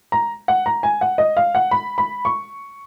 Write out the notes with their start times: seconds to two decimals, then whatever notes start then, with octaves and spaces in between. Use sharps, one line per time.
0.12 A#5
0.48 F#5
0.66 A#5
0.83 G#5
1.01 F#5
1.18 D#5
1.37 F5
1.55 F#5
1.71 B5
1.98 B5
2.25 C#6